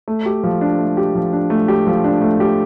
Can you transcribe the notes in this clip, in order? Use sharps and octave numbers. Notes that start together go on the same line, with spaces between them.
A3
G4
F3
D4
A3
G4
F3
D4
A3
G4
F3
D4
A3
G4